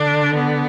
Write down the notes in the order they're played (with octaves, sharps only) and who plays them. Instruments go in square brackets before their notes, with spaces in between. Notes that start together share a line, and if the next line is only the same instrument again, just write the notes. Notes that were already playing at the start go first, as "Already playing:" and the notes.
Already playing: [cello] D3 [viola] D4
[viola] B3